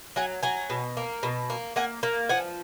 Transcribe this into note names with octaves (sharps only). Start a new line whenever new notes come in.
F#3 F#5 G#5
F#3 F#5 G#5
B2
A#3
B2
A#3
A#3 F#5 G#5
A#3
F3 F#5 G#5